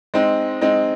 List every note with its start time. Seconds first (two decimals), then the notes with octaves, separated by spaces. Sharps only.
0.14 G#3 C4 D#4
0.61 G#3 C4 D#4